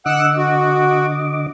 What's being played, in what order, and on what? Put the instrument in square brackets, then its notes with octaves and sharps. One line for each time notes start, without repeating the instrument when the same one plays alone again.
[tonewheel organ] D3 D#5 D6 [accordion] F#5 E6 F#6
[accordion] F#4